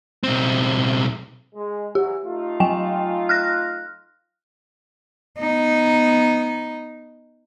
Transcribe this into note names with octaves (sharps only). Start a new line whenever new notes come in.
B1 C4
G#3
E3 F#3 G4
A3 D#4 F4
F#3 G5 G#5
F6 F#6 A#6
B3 D#4